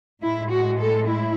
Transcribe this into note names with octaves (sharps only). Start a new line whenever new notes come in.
A2 G#3 E4
F#4
A4
E4